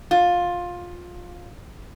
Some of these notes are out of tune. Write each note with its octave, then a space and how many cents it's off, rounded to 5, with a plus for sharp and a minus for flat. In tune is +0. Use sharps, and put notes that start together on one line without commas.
F4 +15